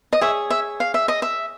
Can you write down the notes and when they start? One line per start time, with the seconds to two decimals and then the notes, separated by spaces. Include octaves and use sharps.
0.13 D#5
0.21 G#4 C#5 E5
0.50 E5
0.80 F5
0.94 E5
1.08 D#5
1.22 E5